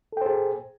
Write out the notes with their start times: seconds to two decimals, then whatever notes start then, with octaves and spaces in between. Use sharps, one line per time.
0.12 A4
0.17 G5
0.21 C5
0.26 G#4